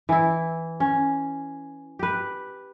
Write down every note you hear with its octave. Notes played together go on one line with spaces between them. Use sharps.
E3 E4
C#4
G4 B4